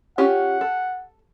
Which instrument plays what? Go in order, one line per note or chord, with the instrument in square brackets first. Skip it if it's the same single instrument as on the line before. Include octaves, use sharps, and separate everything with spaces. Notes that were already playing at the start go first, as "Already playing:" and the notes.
[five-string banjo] C#4 F4 G4 [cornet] F#5
[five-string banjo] A4